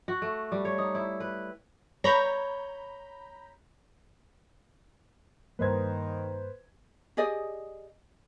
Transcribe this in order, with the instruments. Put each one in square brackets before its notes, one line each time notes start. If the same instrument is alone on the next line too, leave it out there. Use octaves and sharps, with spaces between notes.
[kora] F#4
A3
G3
C#5
D#4
E4
B4
[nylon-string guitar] C#5 [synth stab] A#5 B5 G6
[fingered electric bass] G2 A#3 [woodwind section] D#3 [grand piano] B4 C5 G#6
[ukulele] G4 G#4 D5 D#5